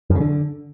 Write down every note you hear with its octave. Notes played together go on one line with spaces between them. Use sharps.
F#2
C#3
D3